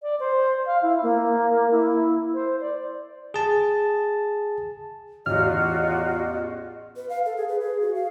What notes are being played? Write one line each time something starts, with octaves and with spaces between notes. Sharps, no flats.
D5
C5
F5
E4
A#3
E4
C5
D5
G#4 A5
A1 E2 F4 F#4 D#5 F6
B4
F5
A4
G#4
B4
G#4
F#4
F5